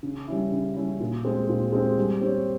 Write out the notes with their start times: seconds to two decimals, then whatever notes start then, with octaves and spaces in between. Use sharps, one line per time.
0.03 C#3
0.28 G3 C#4 E4
0.52 C#3
0.76 G3 C#4 E4
1.00 A#2
1.25 G#3 C4 G4
1.49 A#2
1.73 G#3 C4 G4
1.98 G3
2.21 C4 G4 C#5